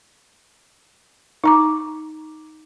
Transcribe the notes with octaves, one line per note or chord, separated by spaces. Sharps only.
D#4 A#5 D6